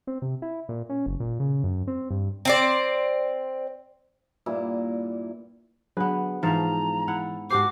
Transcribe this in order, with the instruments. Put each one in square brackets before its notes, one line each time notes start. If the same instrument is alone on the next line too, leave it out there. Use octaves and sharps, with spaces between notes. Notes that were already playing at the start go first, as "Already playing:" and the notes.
[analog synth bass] C4
C3
E4
A#2
C#4
F#1
A#2
C#3
F#2
C4
G2
[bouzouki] C4 C5 D5
[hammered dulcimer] G2 A#2 E4
[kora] D3 B3 [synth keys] F#3 G#4 B4
[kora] G#2 F3 [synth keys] E3 F5 A5 [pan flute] A#5
[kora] E4 F#5
[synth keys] G#2 G4 C7 [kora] F#4 A4 C5 [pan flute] D6